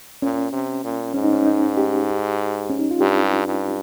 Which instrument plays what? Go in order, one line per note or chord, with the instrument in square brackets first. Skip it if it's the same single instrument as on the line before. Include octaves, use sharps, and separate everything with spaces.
[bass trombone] A#2 [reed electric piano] C#4
[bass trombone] C3
A#2
[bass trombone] G#2 [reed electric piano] C#4
[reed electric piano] D#4
C#4
D#4
G4
C#4
D#4
F4
[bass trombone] G2 [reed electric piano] G4
[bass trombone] G2